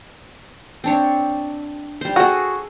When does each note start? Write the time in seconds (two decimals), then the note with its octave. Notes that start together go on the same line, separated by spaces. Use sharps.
0.84 C4 D4 C#5
2.01 G3 C5
2.16 F#4 G#4 A4